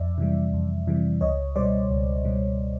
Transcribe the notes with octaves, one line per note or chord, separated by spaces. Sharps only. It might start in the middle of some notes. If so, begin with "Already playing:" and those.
Already playing: F2 D5 E5
C3 E3 G3
F2
C3 E3 G3
C#2 C#5 D#5
B2 G3 C5 D5
C#2
B2 G3